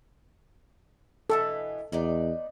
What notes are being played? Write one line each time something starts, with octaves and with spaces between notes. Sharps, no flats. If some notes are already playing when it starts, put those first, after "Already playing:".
B2 E3 B3 A4
E2 B3 D#4 D5